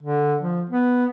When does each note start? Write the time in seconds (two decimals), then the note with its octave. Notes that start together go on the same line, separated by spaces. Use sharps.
0.03 D3
0.41 F3
0.70 B3